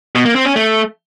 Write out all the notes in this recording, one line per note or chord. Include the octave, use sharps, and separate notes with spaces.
B2
A#3
C4
C#4
A3